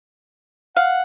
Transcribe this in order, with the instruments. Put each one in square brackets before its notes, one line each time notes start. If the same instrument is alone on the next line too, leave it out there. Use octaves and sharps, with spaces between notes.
[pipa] F5 [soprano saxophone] F#5